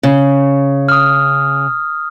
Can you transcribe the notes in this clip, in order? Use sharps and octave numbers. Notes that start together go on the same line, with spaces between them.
C#3
D#6 F6